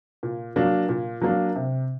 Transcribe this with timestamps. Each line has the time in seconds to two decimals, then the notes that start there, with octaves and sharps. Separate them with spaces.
0.23 A#2
0.56 F#3 A#3 D4
0.89 A#2
1.22 F#3 A#3 D4
1.55 C3